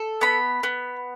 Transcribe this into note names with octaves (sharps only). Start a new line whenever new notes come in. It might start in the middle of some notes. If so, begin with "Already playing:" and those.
Already playing: A4
B3 B5
B3